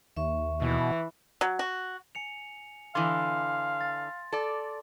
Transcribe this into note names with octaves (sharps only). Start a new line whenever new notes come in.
D#2 E5 C#6
B2 E3
F#3
F#4
G#5 C#7 F7
D3 E3 F5 C6
A6
A4 D5